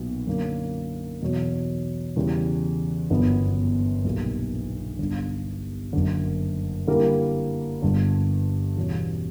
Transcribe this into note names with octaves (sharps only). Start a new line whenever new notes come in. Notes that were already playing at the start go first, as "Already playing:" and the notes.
Already playing: B1 A#2 B3 F#4
F#2 D3 F#3 A#3
E2 B2 F#3
E2 C#3 E3 G3
G1 F#2 D3 F#3 B3
B1 A#2 G3
G1 G2 D3
F#1 F#2 D3
D3 G3 A#3 E4 A#4
G1 G2 D3
E2 B2 G3 C#4 F#4